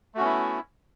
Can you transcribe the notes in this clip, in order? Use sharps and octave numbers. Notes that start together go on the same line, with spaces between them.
A3 B3 C#4 E4 F#4